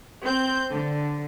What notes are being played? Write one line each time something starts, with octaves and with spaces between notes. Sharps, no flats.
C4 G6
D3